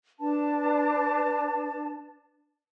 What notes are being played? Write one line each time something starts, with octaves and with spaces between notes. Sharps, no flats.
D4 B4 A5